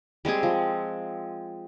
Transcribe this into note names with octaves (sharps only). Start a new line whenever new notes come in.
G3 G#3 C4 G#4
F3